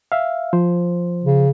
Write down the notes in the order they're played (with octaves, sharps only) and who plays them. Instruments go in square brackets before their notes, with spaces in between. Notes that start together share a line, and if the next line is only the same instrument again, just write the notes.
[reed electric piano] E5 F5
F3 C5
[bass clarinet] C#3